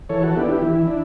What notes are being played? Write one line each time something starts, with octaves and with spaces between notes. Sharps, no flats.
E3 A4 C#5
F#4 A4
B3 D4 E4 G4
E4 G4
E3 E4
D4